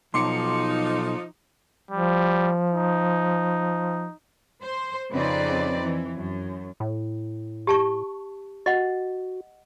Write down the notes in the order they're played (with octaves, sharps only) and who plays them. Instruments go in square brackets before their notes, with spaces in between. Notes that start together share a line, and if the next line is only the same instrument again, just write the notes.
[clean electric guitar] B1 [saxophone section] F3 D#4 [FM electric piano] C6 D6 C#7
[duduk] F3 [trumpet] G3
[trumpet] D#4
[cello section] C5
F2 C#3 C4 D#4 B4 D5
E3
F#2
[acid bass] A2
[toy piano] G4 A5 C#6
[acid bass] F#4 [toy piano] D#5 F#5